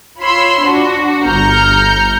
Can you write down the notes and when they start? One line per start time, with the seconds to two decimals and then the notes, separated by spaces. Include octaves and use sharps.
0.19 F4 C#5 B5 C6 E6
0.63 D4 F#4
1.26 G1 A#5 F6 G6 C#7